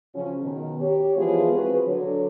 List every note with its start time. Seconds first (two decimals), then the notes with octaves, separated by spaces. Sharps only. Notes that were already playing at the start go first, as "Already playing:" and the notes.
0.15 C#3 F3 F#3 C#4
0.44 B2 D#3
0.81 G4 C#5
1.16 E3 F3 G#3 B3 F4 G#4
1.52 C4 F#4 G#4 B4
1.86 D3 F#3 C#5